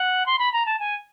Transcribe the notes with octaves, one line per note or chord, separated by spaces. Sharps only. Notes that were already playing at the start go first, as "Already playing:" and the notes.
Already playing: F#5
C6
B5
A#5
A5
G#5